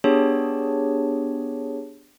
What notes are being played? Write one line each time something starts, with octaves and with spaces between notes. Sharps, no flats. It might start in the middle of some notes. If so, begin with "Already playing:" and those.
B3 D4 G4 G#4 C#5 A5